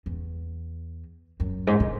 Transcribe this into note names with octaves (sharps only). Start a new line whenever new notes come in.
E2
F#2
G#2
A#2